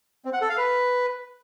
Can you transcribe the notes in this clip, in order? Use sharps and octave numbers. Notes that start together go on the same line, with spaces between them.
C4
F#5
A4
F5
B4